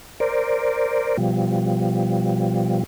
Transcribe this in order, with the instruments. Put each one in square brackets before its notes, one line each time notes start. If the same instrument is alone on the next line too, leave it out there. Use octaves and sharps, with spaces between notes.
[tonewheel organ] A#4 C5 D5
B2 F3 G3